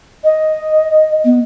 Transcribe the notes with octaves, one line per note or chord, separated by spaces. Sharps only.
D#5
B3